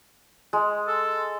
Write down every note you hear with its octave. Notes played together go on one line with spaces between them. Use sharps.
G#3
A4